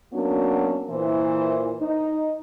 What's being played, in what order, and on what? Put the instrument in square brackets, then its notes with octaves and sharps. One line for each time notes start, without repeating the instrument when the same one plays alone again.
[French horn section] F#3 A#3 B3 C#4 D4 F#4
A#2 E3 C5
D#4